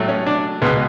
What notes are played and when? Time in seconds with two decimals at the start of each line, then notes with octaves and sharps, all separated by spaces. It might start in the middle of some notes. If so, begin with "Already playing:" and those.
Already playing: A2 F#3 A3
0.08 C#4
0.27 D4
0.62 C#2 B2 G#3 B3